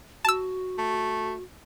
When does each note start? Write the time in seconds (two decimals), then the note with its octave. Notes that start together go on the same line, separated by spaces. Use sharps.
0.25 F#4 A5 E6
0.78 A3